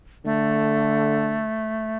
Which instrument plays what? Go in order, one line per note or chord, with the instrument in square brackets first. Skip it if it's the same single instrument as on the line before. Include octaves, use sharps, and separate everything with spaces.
[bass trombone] D3 [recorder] A3